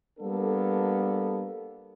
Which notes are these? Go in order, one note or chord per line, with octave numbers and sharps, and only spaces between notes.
G3 A#3 B3 D4 A4